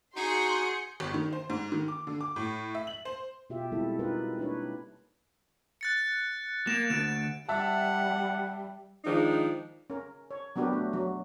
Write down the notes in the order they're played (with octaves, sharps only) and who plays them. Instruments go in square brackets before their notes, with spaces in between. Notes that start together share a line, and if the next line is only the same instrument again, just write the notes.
[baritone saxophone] D#4 [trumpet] F#4 [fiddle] G#4 [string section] C6 G6 C#7
[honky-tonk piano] G1
D#3
C5
G#2
D#3
D6
D3
D6
A2
E5
F#7
C5
[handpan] B2 F4 G4 E5
G3 G#3 C4 E4 A4
D#4 F4 A#4 B4
A#3 D4 B4 C#5
[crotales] F#6 A6 C#7
[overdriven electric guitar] A#3 [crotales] E7
[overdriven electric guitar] D2 [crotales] D7
[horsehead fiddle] G3 [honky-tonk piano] E5 A5 [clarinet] F#5
[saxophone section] D#3 F3 G#3 D4 D#4
[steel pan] C#4 A#4
C#5
F#3 B3 D4 F#4 G4 A#4
A3
F#3